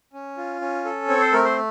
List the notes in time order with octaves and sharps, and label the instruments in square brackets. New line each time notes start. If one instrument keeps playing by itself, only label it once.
[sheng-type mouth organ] C#4
F4
C#4
A4
C4 C#5
C5
A3 A#4
C5